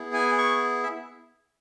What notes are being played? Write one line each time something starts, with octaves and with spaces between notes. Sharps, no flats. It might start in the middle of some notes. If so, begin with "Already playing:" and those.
Already playing: B3 E4 G#4
G#5
C#6
E5